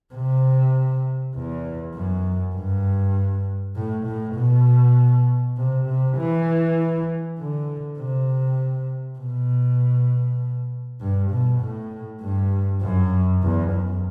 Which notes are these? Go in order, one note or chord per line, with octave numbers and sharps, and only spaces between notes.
C3
E2
F#2
G2
A2
A2
B2
C3
C3
E3
D3
C3
B2
G2
B2
A2
G2
F#2
E2
F#2